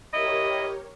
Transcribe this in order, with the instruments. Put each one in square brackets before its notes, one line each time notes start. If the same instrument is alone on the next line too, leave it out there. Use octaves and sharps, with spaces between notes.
[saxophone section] E4 D#5 [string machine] G4 A#4 C#5